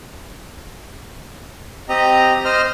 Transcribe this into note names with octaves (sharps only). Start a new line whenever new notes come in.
C4 G4 D#5 A#5
C5 D#5 F6